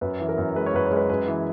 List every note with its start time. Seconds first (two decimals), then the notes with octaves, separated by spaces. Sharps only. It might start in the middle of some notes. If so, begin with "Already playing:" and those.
0.01 F#2 B4
0.20 E3
0.29 A#4
0.38 F#2
0.56 G#3 B4
0.66 C#5
0.74 F#2 B4
0.86 C#5
0.91 G#3
0.97 B4
1.10 F#2 B4
1.28 E3